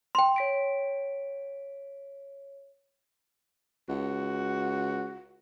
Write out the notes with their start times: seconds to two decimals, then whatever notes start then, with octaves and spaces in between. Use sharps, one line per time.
0.15 G5 C6
0.36 C#5 B6 D7
3.89 C#2 F#4